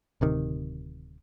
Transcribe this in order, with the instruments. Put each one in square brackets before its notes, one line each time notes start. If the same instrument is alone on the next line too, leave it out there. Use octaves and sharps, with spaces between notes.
[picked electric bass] D1 C3 D#3